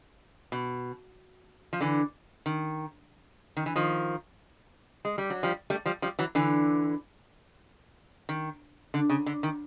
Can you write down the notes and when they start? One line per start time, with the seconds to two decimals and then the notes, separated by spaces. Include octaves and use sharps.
0.52 B2
1.73 F3
1.81 D3 E3
2.46 D#3
3.57 D#3
3.66 E3
3.76 D#3 F3
5.05 G#3
5.18 G3
5.30 F#3
5.43 F3 G3
5.70 G3 A3
5.86 F3 G3
6.02 F3 G3
6.19 E3 F#3
6.35 D3 E3
8.29 D#3
8.94 D3
9.10 C#3
9.26 D3
9.43 D#3